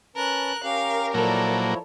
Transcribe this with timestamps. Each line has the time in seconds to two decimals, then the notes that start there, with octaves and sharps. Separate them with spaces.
0.16 C#4 A#4 B4 A5 F#6
0.64 C#4 G4 A#4 F5
1.14 A#2 F3 F#3 A#3 E4 A4 C#5 D5